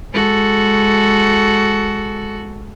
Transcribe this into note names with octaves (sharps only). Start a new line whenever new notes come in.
G#3 F#4 A4